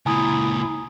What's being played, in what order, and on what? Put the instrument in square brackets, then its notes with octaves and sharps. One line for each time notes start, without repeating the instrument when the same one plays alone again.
[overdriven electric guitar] C#2 A#2 [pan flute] E4 [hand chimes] G#5 A#5 D#6